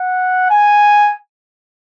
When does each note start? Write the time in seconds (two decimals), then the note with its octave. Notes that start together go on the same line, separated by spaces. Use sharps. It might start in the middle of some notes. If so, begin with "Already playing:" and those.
Already playing: F#5
0.50 G#5